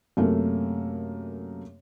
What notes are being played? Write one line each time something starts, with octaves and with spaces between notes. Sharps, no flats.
F#2 C3 A3 A#3